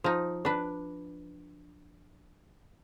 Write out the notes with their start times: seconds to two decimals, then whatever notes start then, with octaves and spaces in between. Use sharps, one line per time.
0.04 F3 D#4
0.45 D4 B4